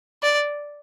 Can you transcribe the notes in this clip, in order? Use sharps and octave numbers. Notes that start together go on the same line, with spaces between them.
D5